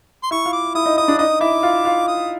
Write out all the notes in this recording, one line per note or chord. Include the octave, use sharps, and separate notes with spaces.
C6
E4 E5 C#6
F4 F5
D6
E4 E5 D#6
D#4 D#5
D#4 D#5 D#6
D4 D5
D#4 D#5 D#6
E4 E5 D6
F4 F5
F4 F5
D#6